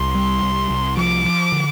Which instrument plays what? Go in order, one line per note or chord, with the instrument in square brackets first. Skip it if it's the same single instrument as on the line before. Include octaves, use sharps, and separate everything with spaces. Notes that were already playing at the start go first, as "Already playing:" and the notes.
Already playing: [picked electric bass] C2 [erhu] C6
[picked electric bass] G3
C2
C2
[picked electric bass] F3 [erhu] D6
[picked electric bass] F3
D3